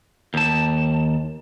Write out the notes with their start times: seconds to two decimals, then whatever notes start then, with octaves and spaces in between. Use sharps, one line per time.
0.34 D#2 A5